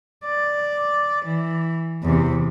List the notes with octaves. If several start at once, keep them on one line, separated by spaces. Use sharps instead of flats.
D5
E3
E2 C3